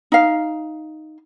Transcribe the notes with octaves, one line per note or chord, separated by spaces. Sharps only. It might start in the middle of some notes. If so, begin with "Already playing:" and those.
D#4 F5